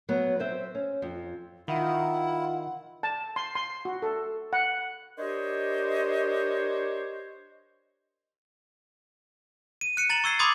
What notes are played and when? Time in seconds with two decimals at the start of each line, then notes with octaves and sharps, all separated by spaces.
0.09 F#3 B3
0.39 C4 C5 E5
0.75 C#4
1.02 F2
1.68 D#3 E4 F4 F#5
3.03 A5
3.36 C6
3.55 C6
3.85 F#4
4.02 A4
4.53 F#5
5.18 D4 G4 A#4 C5 C#5 D#5
9.81 D#7
9.97 F#6 C#7 D#7
10.10 A#5 A6 E7 F#7
10.24 C#6 E6 G#6 C7
10.39 B5 C6 D6 D#6 G#6 A6